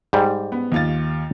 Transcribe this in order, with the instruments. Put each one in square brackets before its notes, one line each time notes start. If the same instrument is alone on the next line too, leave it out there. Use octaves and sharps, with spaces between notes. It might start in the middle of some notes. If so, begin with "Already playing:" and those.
[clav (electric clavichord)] G#2 G3
[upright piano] B3
D#2 F4 A6